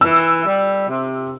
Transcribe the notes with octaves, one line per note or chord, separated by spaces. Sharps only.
E3 E6
G3
C3